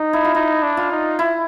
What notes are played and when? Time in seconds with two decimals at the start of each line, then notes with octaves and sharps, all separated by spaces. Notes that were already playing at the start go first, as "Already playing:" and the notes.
Already playing: D#4
0.13 E4
0.25 F4
0.35 D#4 E4
0.63 D4
0.77 F4
0.92 D#4
1.19 E4